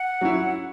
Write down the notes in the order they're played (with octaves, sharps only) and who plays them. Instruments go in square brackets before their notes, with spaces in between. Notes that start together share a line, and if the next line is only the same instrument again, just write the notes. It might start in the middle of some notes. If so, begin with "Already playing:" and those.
Already playing: [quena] F#5
[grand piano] F#3 C#4 E4